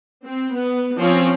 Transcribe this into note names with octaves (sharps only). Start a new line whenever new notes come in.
C4
B3
F3 C4 C#4 C#5